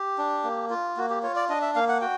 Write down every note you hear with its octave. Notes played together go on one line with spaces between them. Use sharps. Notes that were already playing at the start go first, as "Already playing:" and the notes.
Already playing: G4
D4
A#3
F4
A#3 F#4
G4
F4 C#5
D5
D4 D#5
E5
A#3 F5
F#5
F#4 G5